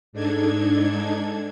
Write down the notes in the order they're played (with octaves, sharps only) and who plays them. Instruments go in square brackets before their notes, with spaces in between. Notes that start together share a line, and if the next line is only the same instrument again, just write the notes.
[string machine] G#2 D4 D#4 A4 G#6